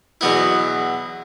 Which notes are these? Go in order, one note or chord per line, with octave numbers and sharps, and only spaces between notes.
E2 B2 F#3 B3 E4